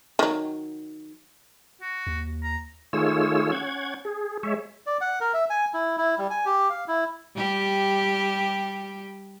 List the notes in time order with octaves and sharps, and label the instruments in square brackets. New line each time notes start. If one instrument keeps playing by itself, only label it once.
[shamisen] D#3 F#3
[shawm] F#4
[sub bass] D#2
[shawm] A#5
[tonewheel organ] D#3 A3 F4 G#4 C#5 E6
C#4 F#5 G#6
G#4
G#3 C#5 E5
[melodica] D5
F#5
A#4
E5
G#5
E4
E4
G3
G#5
G4
F5
E4
[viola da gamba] G3 G4